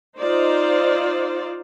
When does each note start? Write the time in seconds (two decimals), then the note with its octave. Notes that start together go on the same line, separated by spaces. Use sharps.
0.19 D#4 F4 C5 D5